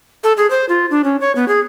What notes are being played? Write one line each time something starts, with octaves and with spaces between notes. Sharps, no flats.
A4
G#4
C5
F4
D4
C#4
C#5
B3
G#4